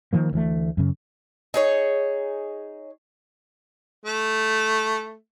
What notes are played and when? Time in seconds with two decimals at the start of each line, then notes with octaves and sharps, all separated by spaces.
0.13 D#3 F3 A#3
0.33 D2 E3 A3
0.77 F#2 C#3
1.54 D#4 G#4 C#5
4.05 A3